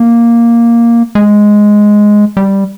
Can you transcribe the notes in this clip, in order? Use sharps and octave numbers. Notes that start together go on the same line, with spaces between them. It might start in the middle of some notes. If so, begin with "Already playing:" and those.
Already playing: A#3
G#3
G3